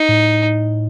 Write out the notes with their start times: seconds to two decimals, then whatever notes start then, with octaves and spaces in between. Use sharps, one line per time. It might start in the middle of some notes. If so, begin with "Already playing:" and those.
Already playing: D#4
0.09 A2